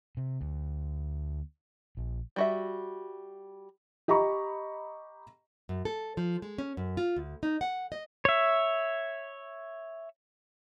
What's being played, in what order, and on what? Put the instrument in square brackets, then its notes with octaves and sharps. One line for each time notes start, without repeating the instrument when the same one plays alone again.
[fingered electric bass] C3
D2
A#1
[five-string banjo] G3 F#4 E5
[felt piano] G4 D#5 A#5 B5 C#6
[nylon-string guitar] F#2
A4
F3
G#3
C#4
F#2
F4
D2
D#4
F#5
D#5
[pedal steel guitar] C#5 E5